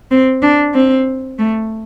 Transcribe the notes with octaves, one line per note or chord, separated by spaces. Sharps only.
C4
D4
C4
A3